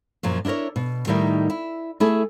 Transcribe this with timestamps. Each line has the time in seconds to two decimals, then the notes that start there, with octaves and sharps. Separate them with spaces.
0.23 F#2 A#2 F3 F#3
0.45 D4 E4 G#4 A#4 C#5
0.76 B2
1.07 A2 D#3 G3 D#4 E4 A#4
1.50 E4
2.00 A3 E4 G#4 A4